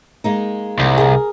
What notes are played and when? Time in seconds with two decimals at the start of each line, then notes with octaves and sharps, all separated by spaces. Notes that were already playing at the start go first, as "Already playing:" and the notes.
0.24 G#3 A#3 D#4
0.79 C2
0.98 G#4 A#4